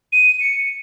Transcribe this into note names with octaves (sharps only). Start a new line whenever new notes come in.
D#7
C#7